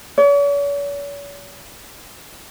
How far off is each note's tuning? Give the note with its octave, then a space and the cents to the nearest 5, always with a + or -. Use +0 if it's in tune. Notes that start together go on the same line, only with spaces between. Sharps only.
C#5 +45